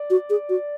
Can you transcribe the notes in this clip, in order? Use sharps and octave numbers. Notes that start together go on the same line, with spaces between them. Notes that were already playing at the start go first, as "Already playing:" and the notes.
Already playing: D5
F#4
G#4
F#4